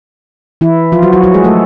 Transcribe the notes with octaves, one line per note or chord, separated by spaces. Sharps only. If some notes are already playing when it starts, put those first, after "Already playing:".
E3 E4
F3 F4
F#3 F#4
F#3 F#4
F#3 F#4
G#3 G#4
A3 A4